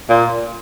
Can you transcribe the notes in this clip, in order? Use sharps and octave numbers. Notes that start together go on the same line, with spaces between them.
A#2